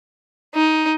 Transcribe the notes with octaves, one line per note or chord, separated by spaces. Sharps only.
D#4